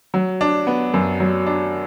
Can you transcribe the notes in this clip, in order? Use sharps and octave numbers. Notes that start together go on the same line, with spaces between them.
F#3
D4
B3
F#2
F#3
D4